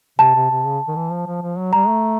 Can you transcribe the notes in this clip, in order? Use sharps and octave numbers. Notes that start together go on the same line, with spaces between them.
C3 A5
C3
C3
C#3
D#3
E3
F3
F3
F3
F#3
G3 A#5
A3